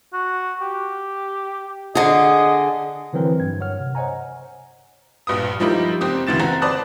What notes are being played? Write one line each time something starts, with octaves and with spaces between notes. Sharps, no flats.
F#4
G4
D3 G#4 D#5
D3 E3 F#3 C4 A#4 B4
G2 G#6
G2 C#5 F#5 F6
C3
C5 C#5 D#5 F#5 G#5 A#5
A#1 G2 B4 D#6
F3 G3 D#4 E4 G4 A#4
F#1 C4 G4 D#6
D2 C#3 E3 A6 E7
F#1 C4 F#5 A#5
B4 C5 D5 A5 D#6 F#6